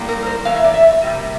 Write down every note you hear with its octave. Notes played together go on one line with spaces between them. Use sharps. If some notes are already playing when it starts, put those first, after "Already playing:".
Already playing: A2 G3 A#3
A#4
A#4
C5
E2 E3 A#3 F5
E5
D5
E5
C3 G3 A#3